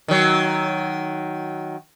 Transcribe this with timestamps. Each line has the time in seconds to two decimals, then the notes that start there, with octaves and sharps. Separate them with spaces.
0.08 D#3 F#3